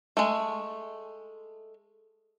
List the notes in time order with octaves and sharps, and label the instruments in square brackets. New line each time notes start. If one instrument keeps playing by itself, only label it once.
[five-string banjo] G#3 A3